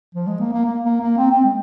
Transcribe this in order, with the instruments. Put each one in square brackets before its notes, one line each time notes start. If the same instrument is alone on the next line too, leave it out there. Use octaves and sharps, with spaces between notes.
[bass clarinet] F3
G#3
A#3
A#3
A#3
A#3
A#3
C4
C4
G#3